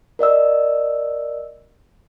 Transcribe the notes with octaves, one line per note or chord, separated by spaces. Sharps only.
A#4 D5 D#5 E6